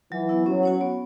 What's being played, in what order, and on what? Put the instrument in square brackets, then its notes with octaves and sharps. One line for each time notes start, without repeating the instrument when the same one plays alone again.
[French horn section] E3 [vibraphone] F#3
[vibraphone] B3 E4
[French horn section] F#3 [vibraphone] C#4
[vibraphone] F#4 C#5 F#5
B3